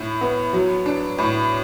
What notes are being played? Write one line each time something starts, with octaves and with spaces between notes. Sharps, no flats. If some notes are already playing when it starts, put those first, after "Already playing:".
Already playing: A2 E4
B3
F#3
D4
A2